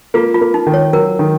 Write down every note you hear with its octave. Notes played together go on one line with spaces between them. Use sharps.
A#3 F4
F4
A#3
D#4
D#3
C#5
F#3 A#4
D#3